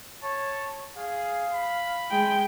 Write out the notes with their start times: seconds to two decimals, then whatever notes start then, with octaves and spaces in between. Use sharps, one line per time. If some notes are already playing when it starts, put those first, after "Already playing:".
0.23 C#5 A5
0.96 G#4 F5
1.53 B5
2.11 G#3 G5